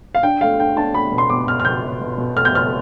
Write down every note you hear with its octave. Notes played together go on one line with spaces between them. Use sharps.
F5
D4 G5
A3 F5
D4 G5
D4 A5
A3 B5
B2
C6
B2 D6
B2 F6
F6
B2 G6
B2
B2
B2
A3 F6
G6
B2 F6